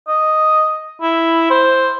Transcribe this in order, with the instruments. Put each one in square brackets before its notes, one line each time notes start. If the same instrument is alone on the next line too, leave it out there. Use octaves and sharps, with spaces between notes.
[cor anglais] D#5
E4
C5